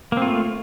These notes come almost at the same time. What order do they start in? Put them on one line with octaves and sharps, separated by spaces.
A#3 C4 F4 A3